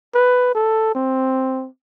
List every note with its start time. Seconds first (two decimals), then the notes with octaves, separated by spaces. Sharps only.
0.15 B4
0.55 A4
0.95 C4